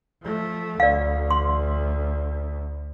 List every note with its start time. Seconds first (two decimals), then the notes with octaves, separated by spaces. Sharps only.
0.22 F3 A3
0.80 D2 D5 F5
1.31 C6